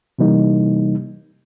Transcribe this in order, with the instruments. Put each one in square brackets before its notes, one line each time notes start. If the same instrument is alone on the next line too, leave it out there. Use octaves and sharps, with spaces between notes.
[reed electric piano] C3 E3 G3 A#3 D#4